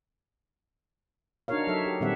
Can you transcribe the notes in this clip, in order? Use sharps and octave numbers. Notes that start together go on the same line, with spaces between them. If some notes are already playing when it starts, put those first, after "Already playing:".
D4 D#4 F#4 A#4 C#5 F5
F#3 D#4 A4 E5
G4
A#2 D#3 G3 C4 E5 F#5